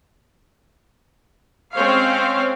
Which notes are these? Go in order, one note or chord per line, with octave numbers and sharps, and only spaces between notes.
G#3 C4 C#4 C5 C#5 F5